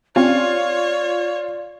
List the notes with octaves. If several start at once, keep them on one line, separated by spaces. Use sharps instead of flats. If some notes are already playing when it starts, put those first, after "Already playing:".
C4 C#4 F4 G4 C#5 D5